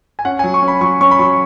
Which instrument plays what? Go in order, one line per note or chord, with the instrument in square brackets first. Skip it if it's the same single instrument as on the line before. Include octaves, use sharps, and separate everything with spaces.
[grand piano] G#5
C#4 F#5
F#3 G#5
C#6
C#4
B5
F#3 C#6
C#4 C#6
B5
F#3 C#6